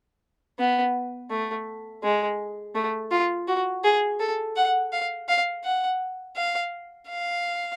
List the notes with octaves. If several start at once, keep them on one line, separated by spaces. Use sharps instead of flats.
B3
A3
G#3
A3
F4
F#4
G#4
A4
F#5
F5
F5
F#5
F5
F5